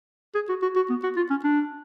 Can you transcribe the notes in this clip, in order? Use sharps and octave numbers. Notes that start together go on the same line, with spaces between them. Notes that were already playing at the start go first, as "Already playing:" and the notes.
G#4
F#4
F#4
F#4
B3
F#4
F4
C#4
D4